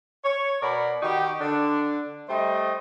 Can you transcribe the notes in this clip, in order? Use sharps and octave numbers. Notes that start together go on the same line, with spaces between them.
C#5
B2 A#4 D5 B5
D#3 D#4 F#4 G4
D3 D4
G3 A3 C5 D#5